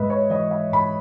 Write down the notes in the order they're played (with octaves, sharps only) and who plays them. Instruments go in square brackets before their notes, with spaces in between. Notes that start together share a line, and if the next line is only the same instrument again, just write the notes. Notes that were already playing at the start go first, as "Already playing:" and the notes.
Already playing: [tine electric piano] G#2 G#3 [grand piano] B4 D#5 E5
[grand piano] C#5
[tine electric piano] E3 [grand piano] D#5
[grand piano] E5
[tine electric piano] G#2 [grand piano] B5